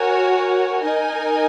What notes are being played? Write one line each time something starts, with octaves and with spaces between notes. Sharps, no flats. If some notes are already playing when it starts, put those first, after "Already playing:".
Already playing: F#4 A#4 C#5 G#5
D#4 A#4 D#5 G#5